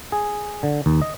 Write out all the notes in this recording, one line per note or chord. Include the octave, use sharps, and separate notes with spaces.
G#4
D3
D#2
D#5